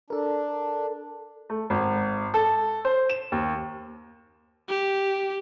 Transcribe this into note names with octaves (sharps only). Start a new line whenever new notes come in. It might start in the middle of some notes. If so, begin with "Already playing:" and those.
D4 A4 A#4
A3
G#1
A4
C5
E7
D#2
G4